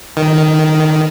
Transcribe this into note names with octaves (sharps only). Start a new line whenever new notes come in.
D#3